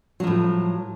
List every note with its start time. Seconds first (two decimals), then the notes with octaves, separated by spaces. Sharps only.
0.20 F#3
0.23 F3
0.27 A2